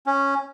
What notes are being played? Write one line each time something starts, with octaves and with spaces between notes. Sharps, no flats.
C#4